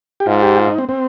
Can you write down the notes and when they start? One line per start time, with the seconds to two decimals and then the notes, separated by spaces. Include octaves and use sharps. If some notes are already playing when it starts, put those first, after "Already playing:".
0.20 G4
0.27 G#2 F4
0.42 G4
0.58 F4
0.67 D#4
0.78 C4
0.89 C4